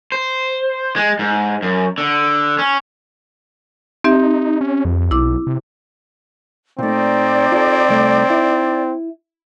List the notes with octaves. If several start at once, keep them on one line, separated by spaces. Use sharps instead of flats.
C5
G#3
G#2
F#2
D3
C#4
C4 D#4 G4 E5
C#4
F2
B1 E4 D6
C3
A#2 A3 C4 D#4 D5
F4 G#4 A4
C2 A3
E4